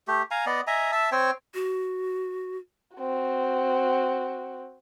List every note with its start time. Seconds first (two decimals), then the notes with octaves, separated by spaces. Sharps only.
0.08 A3 G4
0.31 F5 G#5 A#5
0.46 B3 D5 D#5
0.67 D#5 E5 G#5 A#5
0.92 E5 A5 E6
1.12 C4 C5 C#5 G5
1.54 F#4
2.97 C4 F#4